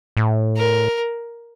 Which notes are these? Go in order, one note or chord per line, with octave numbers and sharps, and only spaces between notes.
A2
A#4